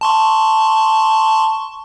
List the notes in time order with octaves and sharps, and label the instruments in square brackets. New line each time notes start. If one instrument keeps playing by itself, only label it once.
[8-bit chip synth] A5 C6 C#6